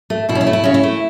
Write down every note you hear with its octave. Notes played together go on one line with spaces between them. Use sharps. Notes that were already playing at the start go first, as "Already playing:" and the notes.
A3
B2 E4
C#4
E4
A3
E4
C#3 C#4
E4
A3